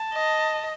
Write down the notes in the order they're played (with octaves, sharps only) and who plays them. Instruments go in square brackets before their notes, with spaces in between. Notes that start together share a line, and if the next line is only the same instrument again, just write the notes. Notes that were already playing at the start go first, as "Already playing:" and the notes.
Already playing: [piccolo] A5
[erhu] D#5